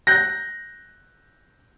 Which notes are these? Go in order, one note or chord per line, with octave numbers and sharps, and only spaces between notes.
F#6 G6 A#6